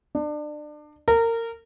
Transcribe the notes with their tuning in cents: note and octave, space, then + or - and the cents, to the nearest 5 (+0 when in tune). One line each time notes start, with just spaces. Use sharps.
D4 +30
A#4 -25